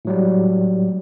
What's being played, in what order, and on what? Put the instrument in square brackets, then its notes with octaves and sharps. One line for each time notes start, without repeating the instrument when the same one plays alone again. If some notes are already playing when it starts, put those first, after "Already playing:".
[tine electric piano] A2 F#3 G3